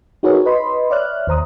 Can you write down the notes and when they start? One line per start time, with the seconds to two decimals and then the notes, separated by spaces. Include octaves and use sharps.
0.23 D#4 F#4 G#4 A#4 B4 C#5
0.46 B4 D#5 B5 C6
0.90 C#5 D5 E5 F6 F#6
1.27 D#2 C5 A#5 D#6